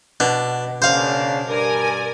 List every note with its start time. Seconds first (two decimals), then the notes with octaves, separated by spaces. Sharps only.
0.20 B2 D4
0.82 C#3 A#3 D4 C5 F5
1.48 G2 A#4 D5 G#5